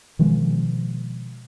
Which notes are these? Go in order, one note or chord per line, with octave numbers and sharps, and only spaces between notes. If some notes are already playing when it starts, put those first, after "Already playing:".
B2 D#3 F3 G#3